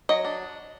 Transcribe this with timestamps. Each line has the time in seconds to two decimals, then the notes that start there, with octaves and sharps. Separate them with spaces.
0.09 F#3 D#5
0.25 D4